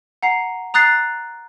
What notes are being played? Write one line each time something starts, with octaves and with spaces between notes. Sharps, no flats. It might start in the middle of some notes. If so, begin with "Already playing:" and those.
F#5 A#5 C7
A#5 D#6 F#6 A6 C7